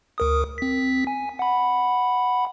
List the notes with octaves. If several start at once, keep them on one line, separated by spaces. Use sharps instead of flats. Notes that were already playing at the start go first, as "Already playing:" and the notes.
D2 A#4 D#6
C4 B6
G#5
F#5 B5